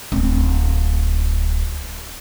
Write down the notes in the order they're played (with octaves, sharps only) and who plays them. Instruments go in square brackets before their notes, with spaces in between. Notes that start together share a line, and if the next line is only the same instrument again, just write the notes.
[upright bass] D1 C4